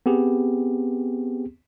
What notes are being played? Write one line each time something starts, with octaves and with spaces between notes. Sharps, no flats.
B3 C4 G4 G#4